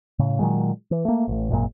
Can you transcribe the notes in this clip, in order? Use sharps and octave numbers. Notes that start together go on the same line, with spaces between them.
A2 C#3
A#2 D#3 F#3 G#3
E3
A3 A#3
A1 A2
G#1 F#2 A#2